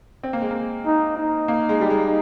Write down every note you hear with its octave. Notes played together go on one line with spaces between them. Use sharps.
C4
A#3
G#3
A#3
D#4
D#4
A#3
G#3
G3
G#3